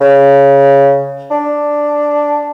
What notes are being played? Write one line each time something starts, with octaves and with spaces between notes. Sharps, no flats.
C#3
D4